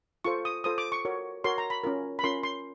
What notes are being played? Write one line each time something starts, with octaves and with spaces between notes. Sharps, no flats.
F4 A4 C5 C#6
D#6
F4 A4 C5 D#6
D6
C#6
F#4 A#4 C#5
F#4 A#4 C#5 C6
A#5
B5
C#4 F4 A#4
B5
C#4 F4 A#4 C6
C6